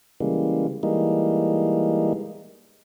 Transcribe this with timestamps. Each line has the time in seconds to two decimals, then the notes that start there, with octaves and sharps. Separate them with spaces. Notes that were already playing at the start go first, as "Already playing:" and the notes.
0.20 C#3 E3 G3 G#3 A#3
0.83 E3 G3 G#3 A#3 D#4